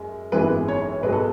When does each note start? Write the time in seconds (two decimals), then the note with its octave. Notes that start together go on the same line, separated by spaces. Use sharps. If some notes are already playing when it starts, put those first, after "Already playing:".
Already playing: F#2 G#3 C#4
0.32 G#1 F#2 E3 G#3 B3 B4
0.68 C#5
1.03 B1 B2 G#3 B4
1.12 A4